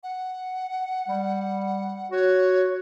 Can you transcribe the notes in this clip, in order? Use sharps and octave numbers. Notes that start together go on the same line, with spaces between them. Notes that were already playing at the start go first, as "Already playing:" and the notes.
F#5
G3
F#4 C#5